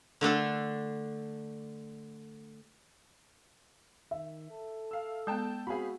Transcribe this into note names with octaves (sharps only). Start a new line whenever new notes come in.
D3 A3 D4 A4
D#3 E5
A4
F5 E6
G#3 B3 G5 A5 G6
C4 F#4 G#4 F5 B5